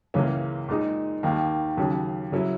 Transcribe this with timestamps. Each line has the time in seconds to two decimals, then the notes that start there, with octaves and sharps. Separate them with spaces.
0.14 C#2 C#3 E3 A#3 C#4
0.69 A#2 G#3 D#4
1.23 D#2 D#3 A#3
1.78 D#2 C#3 F#3 C#4
2.32 C#3 F#3 C#4 E4